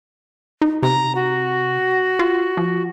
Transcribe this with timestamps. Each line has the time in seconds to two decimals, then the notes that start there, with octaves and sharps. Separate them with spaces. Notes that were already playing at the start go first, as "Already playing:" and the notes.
0.61 D#4
0.83 C3 A#5
1.15 F#4
2.19 F4
2.57 F3